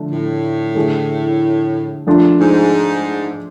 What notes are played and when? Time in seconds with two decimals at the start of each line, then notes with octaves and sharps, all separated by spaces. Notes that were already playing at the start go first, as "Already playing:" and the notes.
Already playing: D3 F3 A3 D4
0.11 A2
0.75 D3 A3 E4 G#4
2.07 F3 A3 D4 F4
2.39 G#2